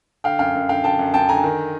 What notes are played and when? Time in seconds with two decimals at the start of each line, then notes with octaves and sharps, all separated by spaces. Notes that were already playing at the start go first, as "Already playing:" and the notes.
0.24 D3 F5 G5
0.39 F#2 F5 G5
0.55 F#2
0.69 D3 F5 G5
0.84 D3 G5 A5
0.99 F#2
1.14 F#2 G5 A5
1.29 D3 G#5 A#5
1.44 D#3